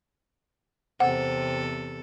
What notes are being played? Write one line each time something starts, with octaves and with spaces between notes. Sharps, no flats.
E2 C3 C4 A4 F#5